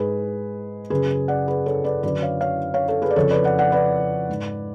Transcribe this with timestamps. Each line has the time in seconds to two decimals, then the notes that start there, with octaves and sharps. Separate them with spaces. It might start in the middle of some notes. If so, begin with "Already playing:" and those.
Already playing: G#2 G#4 B4
0.90 F#2 C#3 G#4 B4
1.28 D5 F#5
1.48 G#4 B4
1.66 A4 C#5
1.84 B4 D5
2.03 F#2 D3 B4 D5
2.22 C#5 F5
2.41 C#5 F5
2.74 C#5 F5
2.88 A4 C#5
3.02 G#4 B4
3.11 D5
3.16 F2 C#3 A4 C#5
3.30 B4 D5
3.44 D5 F#5
3.58 D5 F#5
3.72 B4 D5
4.29 G#2